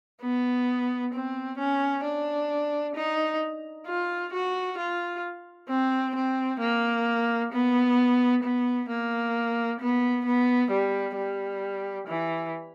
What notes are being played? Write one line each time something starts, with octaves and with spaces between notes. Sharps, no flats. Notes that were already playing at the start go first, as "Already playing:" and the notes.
B3
C4
C#4
D4
D#4
F4
F#4
F4
C4
C4
A#3
B3
B3
A#3
B3
B3
G3
G3
E3